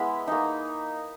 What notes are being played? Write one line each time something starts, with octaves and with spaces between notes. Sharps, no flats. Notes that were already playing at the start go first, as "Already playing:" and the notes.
Already playing: G#3 B3 E4 B5
A#3 D#4